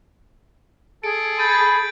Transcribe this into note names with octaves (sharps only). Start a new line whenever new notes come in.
G#4 A4 D7
B5 G6 A6 D#7